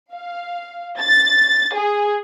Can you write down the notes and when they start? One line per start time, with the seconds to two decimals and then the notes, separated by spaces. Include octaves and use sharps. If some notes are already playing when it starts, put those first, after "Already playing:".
0.13 F5
1.01 A6
1.75 G#4